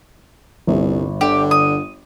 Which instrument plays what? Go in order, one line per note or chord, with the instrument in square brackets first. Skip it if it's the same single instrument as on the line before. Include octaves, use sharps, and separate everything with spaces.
[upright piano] G1 [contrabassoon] C2
[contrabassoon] D3 [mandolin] G4
[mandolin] D#6